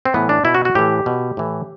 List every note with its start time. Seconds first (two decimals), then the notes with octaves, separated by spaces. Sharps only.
0.05 C4
0.14 A2 E3 B3
0.29 D4
0.44 B2 E4
0.55 F#4
0.65 F#4
0.75 A2 E3 G4
1.06 B2
1.37 A2 E3